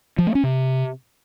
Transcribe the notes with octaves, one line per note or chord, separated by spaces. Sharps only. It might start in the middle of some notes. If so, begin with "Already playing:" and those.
F3
A3
C#4
C3